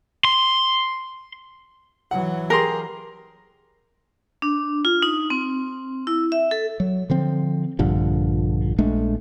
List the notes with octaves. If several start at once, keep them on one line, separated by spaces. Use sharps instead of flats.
C6
E3 F#3 F#5
G4 G#4 A#4 C6
D4
F4
D#4
C4
E4
E5
A4
F#3
D3 F3 C4
A#1 G2 D3 F3
A#1 G#3 A3 D4